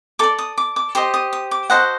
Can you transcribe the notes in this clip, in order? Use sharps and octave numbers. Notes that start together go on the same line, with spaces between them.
A4 D5 D6
D#6
D6
D6
G4 C5 D#5 C6
D#6
D#6
D6
F#4 A4 C5 D#5 F#5